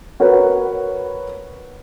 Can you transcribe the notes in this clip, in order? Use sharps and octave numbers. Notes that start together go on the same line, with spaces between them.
F#4 A#4 B4 C#5